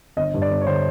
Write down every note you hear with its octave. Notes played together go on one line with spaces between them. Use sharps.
G1 D#5
G2
D5
G1
C#5
D3 C5